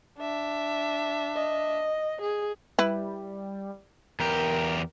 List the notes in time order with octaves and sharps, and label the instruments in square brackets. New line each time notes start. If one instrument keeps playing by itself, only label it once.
[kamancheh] D4 E5
[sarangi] D#5
G#4
[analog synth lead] G3 [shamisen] E4 B4
[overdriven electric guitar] E2 G4 [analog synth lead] A#4